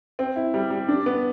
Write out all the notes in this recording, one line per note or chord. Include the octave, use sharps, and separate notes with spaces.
C4
E4
G3
G3
D4
B3